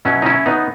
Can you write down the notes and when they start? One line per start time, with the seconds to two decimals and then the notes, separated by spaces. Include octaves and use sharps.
0.05 B2 F#3 C#4 E4
0.22 D#4
0.26 C#4 E4
0.46 B3 D#4